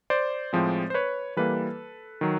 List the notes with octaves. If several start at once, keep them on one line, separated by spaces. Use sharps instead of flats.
C5 D5
A2 F3 G#3 C4
C5
B4 C#5
E3 G3 A#3 A4 B4
D#3 F#3